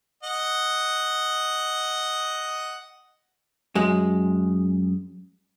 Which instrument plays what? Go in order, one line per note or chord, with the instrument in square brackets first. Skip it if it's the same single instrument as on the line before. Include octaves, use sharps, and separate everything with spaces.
[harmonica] D#5 F#5
[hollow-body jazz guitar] F#2 G#3